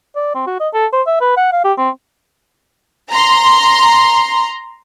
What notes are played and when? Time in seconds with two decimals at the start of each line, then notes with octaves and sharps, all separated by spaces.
0.15 D5
0.35 C4
0.47 F#4
0.60 D#5
0.74 A4
0.93 C5
1.07 E5
1.21 B4
1.37 F#5
1.52 F5
1.64 G4
1.78 C4
3.11 A#5 C6